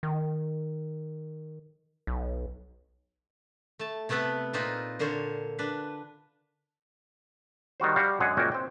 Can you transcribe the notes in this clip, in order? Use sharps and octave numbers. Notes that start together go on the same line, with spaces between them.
D#3
B1
A3 A5
C3 A3 B3 A4 B4
A#2 A#3 C4 D#4 F4 B4
A#2 D3 A#3 C5 C#5
D4 B4
D#3 G3 F#4 C5
G3 F#4 F5
F#2 D3 G#3 G#4 F#5
C#2 A#2 A#3 C#4 F#4 G5
C4 G5